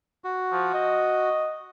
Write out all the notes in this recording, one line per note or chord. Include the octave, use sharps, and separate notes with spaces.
F#4
F3
D#5